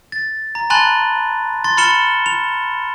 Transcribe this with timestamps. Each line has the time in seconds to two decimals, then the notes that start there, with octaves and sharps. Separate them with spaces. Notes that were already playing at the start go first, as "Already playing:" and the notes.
0.12 A6
0.55 A#5
0.70 G#5 A5 B5 C6 F#6 A6
1.64 C6 A6
1.77 B5 F6 A6 C#7 E7 G7
2.26 F7